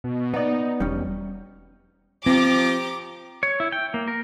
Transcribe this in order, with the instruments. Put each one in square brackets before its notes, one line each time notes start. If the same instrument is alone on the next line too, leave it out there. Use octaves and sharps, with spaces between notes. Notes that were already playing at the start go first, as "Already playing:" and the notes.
[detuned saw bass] B2
[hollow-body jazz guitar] B3 D5 [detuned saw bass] D#4
[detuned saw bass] E1 [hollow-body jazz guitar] G3 C#4
[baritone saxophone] F3 [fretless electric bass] C4 [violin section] G4 A#5 D6
[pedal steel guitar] C#5
E4
G5
A#3
A#4